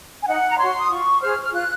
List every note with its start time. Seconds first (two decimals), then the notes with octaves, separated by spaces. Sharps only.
0.22 G#5
0.26 D#4 F#5
0.48 A#5
0.58 F#4 C#5 C6
0.79 D#6
0.89 F4 C#6
1.22 G#4 C5 F6
1.43 F6
1.53 F4 F#6